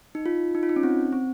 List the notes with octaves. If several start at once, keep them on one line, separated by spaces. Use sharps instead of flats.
D#4
F4
D#4
F4
D#4
C#4
C4
C4